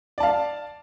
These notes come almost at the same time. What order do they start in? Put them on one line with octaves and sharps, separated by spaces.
D5 A5 F5